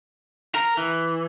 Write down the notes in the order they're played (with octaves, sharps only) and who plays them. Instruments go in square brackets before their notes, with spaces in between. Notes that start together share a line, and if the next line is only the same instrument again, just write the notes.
[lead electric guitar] A#4
E3